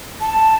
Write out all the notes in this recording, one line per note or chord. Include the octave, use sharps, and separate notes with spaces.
A5